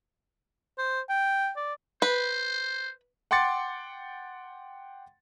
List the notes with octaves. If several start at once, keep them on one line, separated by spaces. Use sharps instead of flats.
C5
G5
D5
B4 C5
F#5 G5 C6 D6 A6 C#7